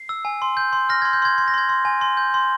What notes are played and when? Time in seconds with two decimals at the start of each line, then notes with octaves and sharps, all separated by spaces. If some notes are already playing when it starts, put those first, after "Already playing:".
Already playing: C7
0.09 E6
0.25 G#5
0.42 C6
0.57 G6
0.73 C6
0.89 F6 A#6
1.02 C6 G#6
1.13 G6
1.22 C6 G#6
1.38 C6 G#6
1.48 A#6
1.54 C6 G#6
1.69 C6
1.85 G#5
2.01 C6
2.17 G6
2.34 C6